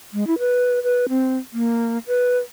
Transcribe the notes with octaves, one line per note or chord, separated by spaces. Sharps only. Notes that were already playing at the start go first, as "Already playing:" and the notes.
G#3
E4
B4
B4
C4
A#3
B4